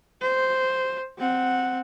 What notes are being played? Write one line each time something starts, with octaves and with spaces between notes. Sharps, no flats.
C5
C4 F#5